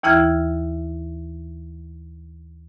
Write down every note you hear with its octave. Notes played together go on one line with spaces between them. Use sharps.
D#2 E3 E4 F6 G#6